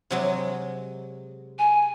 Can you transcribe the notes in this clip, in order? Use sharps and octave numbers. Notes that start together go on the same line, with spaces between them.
C3 F#3 G#3
G#5